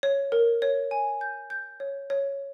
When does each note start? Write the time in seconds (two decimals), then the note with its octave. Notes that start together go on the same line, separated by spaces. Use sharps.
0.03 C#5
0.32 A#4
0.62 C#5
0.91 G#5
1.21 G6
1.50 G6
1.80 C#5
2.10 C#5